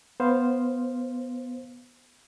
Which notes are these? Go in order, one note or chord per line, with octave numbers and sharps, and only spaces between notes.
B3 C5 F5